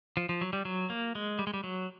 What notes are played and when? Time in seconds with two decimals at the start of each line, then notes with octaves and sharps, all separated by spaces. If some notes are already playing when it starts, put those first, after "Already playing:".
0.17 F3
0.29 F3
0.41 F#3
0.53 G3
0.65 F#3
0.90 A#3
1.15 G#3
1.39 G3
1.47 G#3
1.54 G3
1.64 F#3